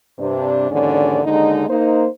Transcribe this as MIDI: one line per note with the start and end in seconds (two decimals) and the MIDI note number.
0.18 0.67 43
0.18 0.67 48
0.18 0.67 62
0.71 1.19 39
0.71 1.19 44
0.71 1.19 50
0.71 1.19 52
0.71 1.19 61
0.71 1.19 74
1.25 1.68 39
1.25 1.68 50
1.25 1.68 56
1.25 1.68 63
1.68 2.07 58
1.68 2.07 63
1.68 2.07 72